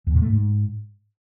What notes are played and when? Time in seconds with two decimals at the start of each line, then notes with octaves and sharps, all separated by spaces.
0.07 E2
0.14 A#2
0.22 A3
0.30 G#2